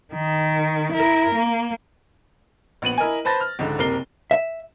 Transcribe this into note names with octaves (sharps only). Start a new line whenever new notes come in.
D#3
E4 A#4
A#3
A#1 B3 D#7 F#7
E4 A#4 D#5 G#5
B4 C5 A5 B5 A6 A#6
F6
C#2 G#2 D3
F#1 C3 A#4 C7 G7
E5